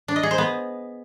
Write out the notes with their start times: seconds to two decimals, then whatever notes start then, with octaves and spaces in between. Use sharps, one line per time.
0.08 D4
0.16 D#5
0.23 G#4
0.31 C5
0.38 B3